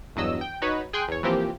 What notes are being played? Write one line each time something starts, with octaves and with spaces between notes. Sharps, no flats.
E2 G2 F#3 D#5 E6
G5
D#4 F#4 B4 C#5
G#4 G5 G#5 C6 F#6
E2 C#5
E3 F3 A#3 C4 G4